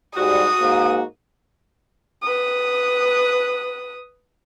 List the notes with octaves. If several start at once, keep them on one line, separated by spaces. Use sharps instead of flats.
G#2 G3 F#4 D#6
G#2 A#3
B4 D#6